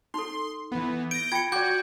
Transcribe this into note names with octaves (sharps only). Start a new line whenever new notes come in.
D#4 A4 C6
E3 B3
G6 A#6 D7
F4 G5 B5 G#6 C#7
F#4 D5 G5 D6 G6